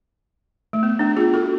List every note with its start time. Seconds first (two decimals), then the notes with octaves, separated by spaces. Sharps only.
0.73 A3
0.83 B3
0.99 B3 D4
1.17 F4 G#4
1.34 F#4 A4